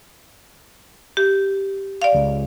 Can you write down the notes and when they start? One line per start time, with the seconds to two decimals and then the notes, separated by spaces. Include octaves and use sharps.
1.17 G4
2.02 D5 F5
2.14 C#2